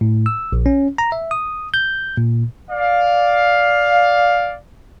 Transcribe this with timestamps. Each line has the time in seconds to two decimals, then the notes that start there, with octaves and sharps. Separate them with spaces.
0.01 A2
0.26 E6
0.52 A#1
0.66 C#4
0.98 A#5
1.12 E5
1.31 D#6
1.74 G6
2.17 A#2
2.71 D5 F5